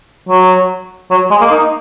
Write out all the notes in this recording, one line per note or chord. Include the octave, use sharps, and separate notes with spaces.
F#3
F#3
G#3
A#3
D#4